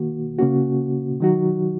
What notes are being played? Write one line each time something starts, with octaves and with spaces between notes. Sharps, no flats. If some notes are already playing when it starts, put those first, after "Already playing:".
Already playing: D#3 A#3 F#4
C#3 A#3 C#4 F#4
D#3 F#3 D#4 F#4